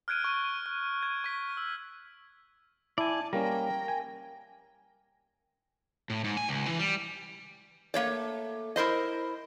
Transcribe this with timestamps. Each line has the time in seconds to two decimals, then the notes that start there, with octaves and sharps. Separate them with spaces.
0.08 F6 F#6 G#6 D7 D#7
0.24 C#6
0.66 F#6
1.03 G#6
1.24 C#6 B6
1.57 E6
2.98 E4 D5 G#5 A5
3.33 G3 A#3 C#4 A#4 G5
3.88 G#5
6.10 A2
6.24 G#2
6.37 G#5
6.49 C#2
6.68 E3
6.79 G3
7.94 A3 A#3 C#5 D5
8.76 E4 A#4 C5 D#5